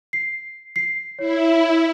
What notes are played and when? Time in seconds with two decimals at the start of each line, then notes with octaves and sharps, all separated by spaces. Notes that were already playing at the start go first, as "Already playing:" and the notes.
0.13 C7
0.76 C7
1.19 E4 C#5